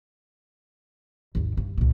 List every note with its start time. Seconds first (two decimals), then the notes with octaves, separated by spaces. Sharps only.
1.35 G#1 D#2
1.57 G2
1.78 C#2 A#2